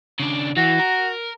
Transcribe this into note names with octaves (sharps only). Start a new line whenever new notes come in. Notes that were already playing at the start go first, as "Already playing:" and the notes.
C#3 D4
E3 F#4
A#4